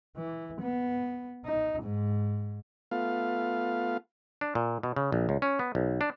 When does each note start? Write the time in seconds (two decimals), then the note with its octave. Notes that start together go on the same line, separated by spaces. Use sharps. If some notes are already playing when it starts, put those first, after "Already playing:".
0.17 E3
0.61 B3
1.46 D#4
1.83 G#2
2.91 A3 B3 F4 F5
4.41 D4
4.55 A#2
4.83 B2
4.96 C#3
5.12 A#1
5.29 C#2
5.42 C#4
5.59 B3
5.75 B1
6.01 D4